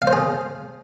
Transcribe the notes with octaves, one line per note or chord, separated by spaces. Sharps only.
F5
C5
G#4